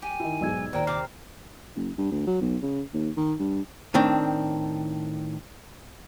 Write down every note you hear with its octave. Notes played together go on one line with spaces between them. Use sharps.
G4 G#5
D#3 E4
B1 G#2 G#4 D5 E6 G#6
D#2 A#2 C5 G5 A#5
C3 D6 F6 C7
F#1
G2
D2
F#3
B1
C#3
D#2
D#3
G2
A2 D#3 C4 D4